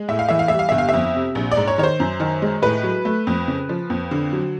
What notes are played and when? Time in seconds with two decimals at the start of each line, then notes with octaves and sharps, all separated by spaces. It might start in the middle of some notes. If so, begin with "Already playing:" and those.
Already playing: G#3
0.08 A2 E5
0.19 F5
0.29 E3 E5
0.39 F5
0.48 G3 E5
0.59 F5
0.69 G1 E5
0.78 F5
0.89 F2 E5
1.15 C3
1.35 A#1
1.51 D5
1.57 G#2
1.67 C#5
1.78 D#3 C#5
1.83 C5
2.00 F#2
2.20 D#3
2.42 G#3
2.62 A2 B4
2.83 F#3
3.05 A3
3.27 F2
3.48 C#3
3.69 F3
3.90 F2
4.11 D3
4.33 F#3